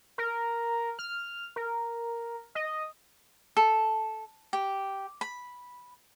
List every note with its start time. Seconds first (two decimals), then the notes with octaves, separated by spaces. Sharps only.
0.18 A#4
0.99 F6
1.56 A#4
2.55 D#5
3.57 A4
4.53 G4
5.21 B5